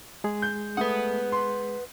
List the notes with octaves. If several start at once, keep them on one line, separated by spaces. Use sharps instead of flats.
G#3 G#4
G6
A3 B4 F#5 D#6
C6